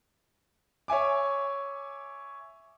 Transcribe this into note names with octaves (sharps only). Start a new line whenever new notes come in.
C#5 E5 G#5 D6